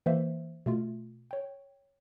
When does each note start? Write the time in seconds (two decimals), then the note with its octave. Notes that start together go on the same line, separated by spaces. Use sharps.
0.06 E3 A#3 C5 E5
0.66 B2 A3 F4
1.31 C#5 G5